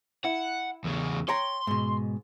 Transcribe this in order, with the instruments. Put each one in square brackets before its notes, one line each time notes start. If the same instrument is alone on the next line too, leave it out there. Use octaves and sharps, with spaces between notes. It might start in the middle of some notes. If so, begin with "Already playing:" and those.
[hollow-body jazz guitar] E4 [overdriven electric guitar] F#5
[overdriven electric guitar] E2 C#3
[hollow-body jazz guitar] C#5 G5 A#5 [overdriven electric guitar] C6
[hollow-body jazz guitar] G#2 B2